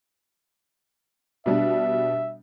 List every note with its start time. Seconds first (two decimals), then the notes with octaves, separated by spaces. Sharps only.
1.46 B2 G3 D4 E5